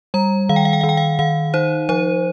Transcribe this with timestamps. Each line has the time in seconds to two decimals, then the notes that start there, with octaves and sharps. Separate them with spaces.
0.14 G3 A#5
0.49 D#3 F5
0.56 G5
0.65 F5
0.73 G5
0.81 D#3 F5
0.89 G5
0.97 F5
1.19 D#3 F5
1.54 D#4 C5
1.89 F3 C5